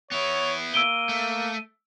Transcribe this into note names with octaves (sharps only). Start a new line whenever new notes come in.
B3 E4 C#5 F7
A#3 E6 D7 D#7 G7
A3